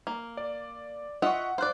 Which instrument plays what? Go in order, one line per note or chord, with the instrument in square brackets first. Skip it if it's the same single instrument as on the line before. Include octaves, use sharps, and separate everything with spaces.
[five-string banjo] A#3
[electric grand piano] D5
[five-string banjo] F4 D#5 E5 [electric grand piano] F#5 C#6
[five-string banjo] C5 D5 [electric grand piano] F5 F#6